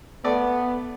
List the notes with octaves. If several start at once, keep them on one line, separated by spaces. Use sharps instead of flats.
A3 B3 D5 D6